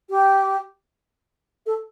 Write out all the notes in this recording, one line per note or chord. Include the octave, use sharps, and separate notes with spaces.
G4
A4